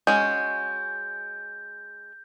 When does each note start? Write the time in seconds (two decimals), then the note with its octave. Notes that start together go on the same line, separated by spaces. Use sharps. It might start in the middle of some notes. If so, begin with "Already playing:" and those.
0.07 G#3 C#4 F#4 G6